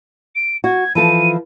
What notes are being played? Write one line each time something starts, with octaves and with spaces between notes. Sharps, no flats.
D7
F#4 G#6
E3 F3 A4 D#7